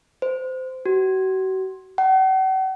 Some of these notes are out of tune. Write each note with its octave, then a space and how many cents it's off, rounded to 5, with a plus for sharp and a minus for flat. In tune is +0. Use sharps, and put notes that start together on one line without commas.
C5 -20
F#4 +40
F#5 +45